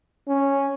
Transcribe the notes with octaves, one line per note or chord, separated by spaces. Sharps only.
C#4